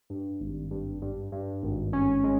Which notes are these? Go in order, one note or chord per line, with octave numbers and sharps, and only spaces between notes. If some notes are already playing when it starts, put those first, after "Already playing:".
G2
G#1
G2
G2
G2
G#1
C#4
G#3